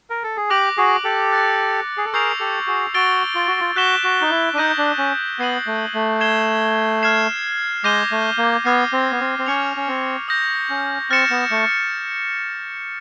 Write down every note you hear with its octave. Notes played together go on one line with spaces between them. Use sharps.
A#4
A4
G#4
G4 D6 F#6 A#6 D7 F#7
F#4 G#4
G4 A4
F#6 A6 C#7
G#4
A4
G#4 A#4 C#6 E6 G6 C7 F7
G4 A4
F#4 G#4
F#4 E6 A6 D7 G7
F4
F#4
F4
F#4 F#6 B6 E7 G7
F#4
D#4
E4
D4
D#4 D#6 G6 A#6 D#7
D4
C#4
B3 G#6 C7 D#7 F#7
A3
A3
G#6 C7 E7 G7
F6 G#6 C7 E7
G#3 D6 G6 A#6 D#7 G7
A3
A#3
B3 D6 F6 G#6 C7
C4
B3
C4
C4
C#4 C#6 F6 G#6 C#7 F7
C#4
C4
D#6 G6 A#6
C#4
C4 F6 A6 C#7 E7
B3
A3